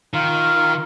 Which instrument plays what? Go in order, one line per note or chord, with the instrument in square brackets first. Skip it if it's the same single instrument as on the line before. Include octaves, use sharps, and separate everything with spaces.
[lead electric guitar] D#3 [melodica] F4